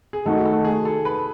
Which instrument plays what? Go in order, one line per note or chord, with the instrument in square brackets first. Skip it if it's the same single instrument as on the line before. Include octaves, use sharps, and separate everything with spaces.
[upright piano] G#4
[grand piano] D#3 A3 D#4 F#4 [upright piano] A4
[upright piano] A4
G#4
A4
B4